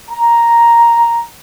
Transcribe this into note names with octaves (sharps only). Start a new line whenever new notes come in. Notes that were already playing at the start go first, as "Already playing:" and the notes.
A#5